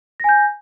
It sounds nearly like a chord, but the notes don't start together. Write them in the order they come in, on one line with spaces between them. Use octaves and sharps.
A#6 G#5 G6